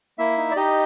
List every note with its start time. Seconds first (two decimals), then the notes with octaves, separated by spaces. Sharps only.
0.18 A#3 E4 E5
0.37 D#4
0.51 D5
0.56 D#4 G4 D#5